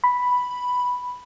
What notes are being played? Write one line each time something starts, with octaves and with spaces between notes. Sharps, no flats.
B5